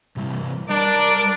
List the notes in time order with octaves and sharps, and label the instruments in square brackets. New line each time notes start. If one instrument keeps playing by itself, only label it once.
[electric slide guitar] C3 E3 G3
[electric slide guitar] G3 [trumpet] D4 [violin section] A#4 D5 D7